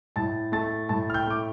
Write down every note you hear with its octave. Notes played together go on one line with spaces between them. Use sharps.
A2 A5 A6
A3 A5 A6
A2 A5 A6
F6
G5 G6
A3 D6